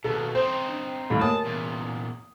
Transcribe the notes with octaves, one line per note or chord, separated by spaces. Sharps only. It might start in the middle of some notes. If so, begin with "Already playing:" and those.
D#2 B2 A4 A#5
C4 D#4 C5
D4
D#2 A2
A#3 A#4 C#5 A5 D#6
E2 A#2